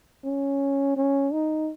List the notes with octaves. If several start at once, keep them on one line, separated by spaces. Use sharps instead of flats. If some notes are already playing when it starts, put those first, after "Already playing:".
C#4
C#4
D#4